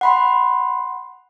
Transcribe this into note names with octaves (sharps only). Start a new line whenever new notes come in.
F#5 B5 C6